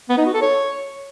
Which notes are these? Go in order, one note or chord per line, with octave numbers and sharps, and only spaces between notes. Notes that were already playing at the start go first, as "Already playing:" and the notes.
B3
D#4
F#4
A4
C#5